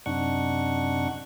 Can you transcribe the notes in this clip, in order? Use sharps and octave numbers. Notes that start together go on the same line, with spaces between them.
F#2 C3 D4 D#4 F#5 C#6